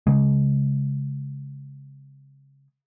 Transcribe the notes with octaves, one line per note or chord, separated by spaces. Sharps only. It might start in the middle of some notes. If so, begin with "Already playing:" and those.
C#3 G#3